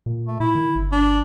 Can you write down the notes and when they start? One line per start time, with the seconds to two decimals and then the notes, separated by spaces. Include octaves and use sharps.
0.06 A#2
0.27 A3
0.40 A#2 E4
0.55 D#3
0.75 G1
0.92 D4